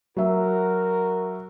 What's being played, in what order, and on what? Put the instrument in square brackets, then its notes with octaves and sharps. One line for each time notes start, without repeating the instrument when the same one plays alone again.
[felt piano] F#3 E5 [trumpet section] F#4 A#4